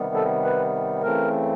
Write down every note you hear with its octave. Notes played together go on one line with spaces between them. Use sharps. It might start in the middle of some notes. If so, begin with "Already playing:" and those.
Already playing: C3 D#3 G3 B3
A4
B4
C#3 E3 A3 C4 A#4